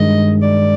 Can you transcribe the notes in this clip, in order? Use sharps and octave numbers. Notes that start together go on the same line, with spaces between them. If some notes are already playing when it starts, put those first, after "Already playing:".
Already playing: G2 D#3 G#3 D#5
D5